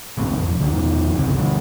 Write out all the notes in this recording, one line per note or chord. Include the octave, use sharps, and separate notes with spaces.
A1 D2 G#2 C4
E1 F2
C#2 D3 D4
E2 G#2 B2 D#3
G1 C#2 C3
B2 D3 G3